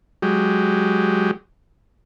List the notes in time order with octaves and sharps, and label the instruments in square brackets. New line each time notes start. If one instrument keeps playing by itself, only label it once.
[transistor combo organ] F#3 G#3 G4